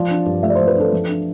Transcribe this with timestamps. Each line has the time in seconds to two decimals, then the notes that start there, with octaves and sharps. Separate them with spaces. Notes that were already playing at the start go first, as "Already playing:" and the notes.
Already playing: F3 D5
0.11 D4
0.26 G2
0.43 A3 E5
0.49 D5
0.55 C5
0.59 F3
0.67 B4
0.76 D4 A4
0.93 F3
1.09 D4